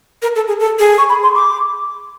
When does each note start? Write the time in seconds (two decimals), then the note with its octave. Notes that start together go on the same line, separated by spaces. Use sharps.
0.22 A#4
0.36 A4
0.47 G#4
0.60 A4
0.79 G#4
0.98 C#6
1.09 B5
1.23 C6
1.35 D6